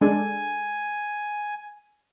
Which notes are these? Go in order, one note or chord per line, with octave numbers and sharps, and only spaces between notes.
G#3 D4 A4 G#5